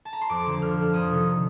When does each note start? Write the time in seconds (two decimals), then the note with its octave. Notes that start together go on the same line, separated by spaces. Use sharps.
0.05 A5
0.13 A#5
0.21 C6
0.29 F2 D6
0.46 D3 F3
0.62 F2 F6
0.78 D3 F3
0.94 F2 D#6
1.10 C3 D#3